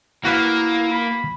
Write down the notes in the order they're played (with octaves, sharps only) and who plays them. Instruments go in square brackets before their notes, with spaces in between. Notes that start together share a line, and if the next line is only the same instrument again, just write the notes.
[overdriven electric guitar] A#3 [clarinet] E4 [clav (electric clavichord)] F#4 B4 F5
[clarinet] B5